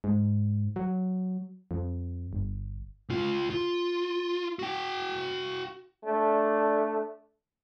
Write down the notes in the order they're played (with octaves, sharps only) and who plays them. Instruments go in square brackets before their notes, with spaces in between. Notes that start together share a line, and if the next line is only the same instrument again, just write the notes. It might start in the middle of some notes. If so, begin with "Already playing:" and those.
[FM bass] G#2
F#3
F2
G1
[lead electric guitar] C#2 F4
F4
F#4 G5
[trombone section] A3 D4